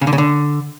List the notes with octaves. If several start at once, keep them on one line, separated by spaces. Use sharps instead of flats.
C#3
D3
C#3
D3